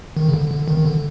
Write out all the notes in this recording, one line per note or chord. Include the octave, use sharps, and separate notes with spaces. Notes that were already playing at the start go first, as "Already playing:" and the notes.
D#3
C#3
D3
D3
D#3
D#3
D3